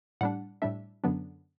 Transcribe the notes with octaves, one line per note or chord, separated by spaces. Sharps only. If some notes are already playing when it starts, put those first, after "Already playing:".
A2 G3 D4 F#5
A2 G3 D4 E5
F#2 D3 F#3 B3 D4